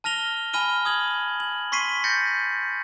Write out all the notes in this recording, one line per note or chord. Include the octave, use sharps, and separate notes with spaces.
A5 F6 A#6 F7 G7
G#5 B5 F6 D#7 G7
D#6 G#6 F#7
F#7
C6 C#6 B6 C7 D#7
G6 A6 A#6 C#7